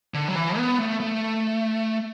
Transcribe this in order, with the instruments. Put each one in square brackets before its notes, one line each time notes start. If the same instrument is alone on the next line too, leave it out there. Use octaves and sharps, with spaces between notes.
[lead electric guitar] D3
F#3
E3
B3
A3
A3